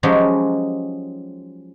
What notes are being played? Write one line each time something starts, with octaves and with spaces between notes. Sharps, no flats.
F3 F#3 G#3 C#4 D#4 G4